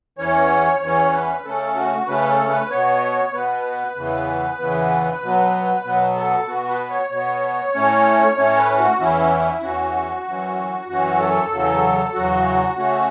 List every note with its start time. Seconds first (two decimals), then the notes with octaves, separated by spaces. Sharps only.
0.18 E2 E3 C#4 C#5
0.81 E2 E3 C#4 C#5
1.13 B4
1.45 C#3 A3 C#4 A4
1.75 F#4
2.07 C#3 A3 C#4 B4
2.28 A4
2.49 B4
2.70 B2 B3 C#5
3.33 B2 B3 B4
3.96 E2 C#3 E3 B3
4.59 E2 C#3 E3 B3
5.22 B2 F#3 B3
5.85 B2 F#3 B3
6.16 A4
6.47 B2 B3 F#4
6.69 B4
6.90 C#5
7.11 B2 B3 C#5
7.74 A2 A3 C#4
8.36 A2 A3 C#4 C#5
8.58 B4
8.79 F#4
8.99 E2 E3 C#4 E4
9.62 E2 E3 C#4 F#4
10.25 F#2 E3 C#4
10.88 F#2 E3 C#4 F#4
11.20 A4
11.52 E2 C#3 F#3
12.14 E2 C#3 F#3 F#4
12.77 C#3 A3 C#4 F#4